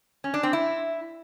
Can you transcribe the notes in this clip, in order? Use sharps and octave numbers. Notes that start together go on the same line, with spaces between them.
C#4
D4
C4
E4